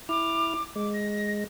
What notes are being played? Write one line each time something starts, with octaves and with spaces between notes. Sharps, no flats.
E4 D6 F6
G#3 D6
A#6